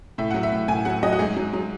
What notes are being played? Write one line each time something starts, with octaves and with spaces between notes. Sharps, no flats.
A2 E5
F#3 F#5
E5
A2
A2 G#5
F#3 F#5
F#3 D#5
F#4
G#2 G#4
F#3
F#3